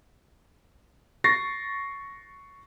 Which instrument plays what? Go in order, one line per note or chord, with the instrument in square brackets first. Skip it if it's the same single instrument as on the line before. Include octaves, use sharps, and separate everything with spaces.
[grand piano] C#6 A6 A#6 C7